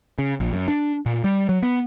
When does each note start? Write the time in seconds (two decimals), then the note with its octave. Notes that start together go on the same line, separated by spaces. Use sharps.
0.19 C#3
0.40 A#1
0.53 F#2
0.68 D4
1.06 A#2
1.24 G3
1.49 F#3
1.63 B3